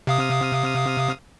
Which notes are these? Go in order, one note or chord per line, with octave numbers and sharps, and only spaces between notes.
C3 F5 D#6